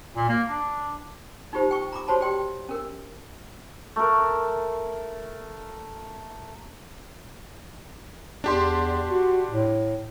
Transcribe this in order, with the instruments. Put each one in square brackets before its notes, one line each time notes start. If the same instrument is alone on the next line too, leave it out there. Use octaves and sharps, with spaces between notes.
[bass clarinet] A#2
A#3
D4
[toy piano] D#4 F4 G4 C5
G5 C#6
A#5 B5 D6
F#4 C5 C#5 A5 B5
G4 D5 G5 C6
C#4 A#4
[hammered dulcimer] A3 A#4
[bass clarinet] E2 [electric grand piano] D4 G4 C6
[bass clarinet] F#4
A2